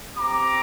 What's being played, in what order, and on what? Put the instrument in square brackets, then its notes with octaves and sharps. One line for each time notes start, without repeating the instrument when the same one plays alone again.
[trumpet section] C4 G4 A#5 D6